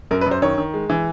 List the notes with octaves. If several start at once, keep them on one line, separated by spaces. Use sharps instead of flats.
F#2 A#4
B4
F#2
C5
D#3 C#5
D#3
G#3
E3